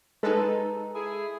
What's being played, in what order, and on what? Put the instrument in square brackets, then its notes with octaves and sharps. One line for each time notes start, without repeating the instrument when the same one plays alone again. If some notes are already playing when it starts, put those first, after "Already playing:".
[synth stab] G#3 A4 [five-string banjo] D#4 B4
[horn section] E4 G#4